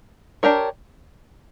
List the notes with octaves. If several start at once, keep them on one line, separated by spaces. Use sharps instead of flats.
D4 G4 A#4 C#5